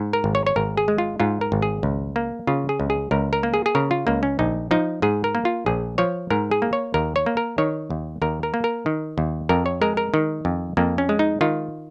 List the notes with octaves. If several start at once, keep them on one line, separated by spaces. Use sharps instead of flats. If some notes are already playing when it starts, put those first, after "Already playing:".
Already playing: G#2
A#4
G#1
C#5
C#5
G#1 A#4
G#4
G#3
F4
G#2 F4
A#4
G#1
G#4
C#2
A#3
C#3 F4
G#4
C#2
G#4
C#2 A#4
A#4
A#3
G#4
G#4
C#3 A#4
F4
C#2 A#3
C#4
A#1 D#4
F3 D#4
G#2 G#4
A#4
A#3
F4
A#1 G#4
F3 C#5
G#2 A#4
G#4
A#3
C#5
D#2 A#4
C#5
A#3
A#4
D#3 C#5
D#2
D#2 A#4
A#4
A#3
A#4
D#3
D#2
F2 A#4
C#5
G#3 A#4
A#4
D#3
F2
F2 A#3
C#4
G#3
D#4
D#3 F4